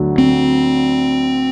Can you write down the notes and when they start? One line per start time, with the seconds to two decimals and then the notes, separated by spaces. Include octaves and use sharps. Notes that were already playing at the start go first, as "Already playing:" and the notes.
Already playing: D2 D3 F#3
0.18 C4